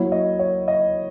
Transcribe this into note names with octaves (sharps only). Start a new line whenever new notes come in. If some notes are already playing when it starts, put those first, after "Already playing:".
Already playing: F#3 A#3 E4 C#5
D#5
C#5
D#5